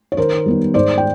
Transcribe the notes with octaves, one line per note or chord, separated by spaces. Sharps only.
C#5
D#3 A#4 C5
G3 B3 D#4
G#2 C5 D5
G5